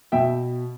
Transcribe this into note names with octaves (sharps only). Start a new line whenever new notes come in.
B2 E5 G5